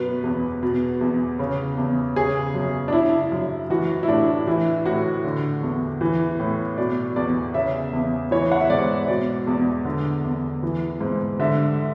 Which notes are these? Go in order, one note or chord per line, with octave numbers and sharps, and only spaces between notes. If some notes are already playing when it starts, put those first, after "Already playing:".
Already playing: F#2 B2 B4
E2
B2
E2
C#3
E2
C#3 G#4
F#2
D4
C#3 E4
F#2
E3 F#4
E4
A2 D4
E3 E4
A2 F#4
D3
E2
E3
A2
B2 D5
E2 D5
C#3 E5
E2
E3 C#5
F#5
E5
G#2 D5
B2 D5
E2
D3
E2
E3
G#2
D3 E5